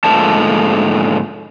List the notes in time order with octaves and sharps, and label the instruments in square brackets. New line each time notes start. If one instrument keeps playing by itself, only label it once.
[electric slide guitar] G#2 D3 F3 A3 A#3 A5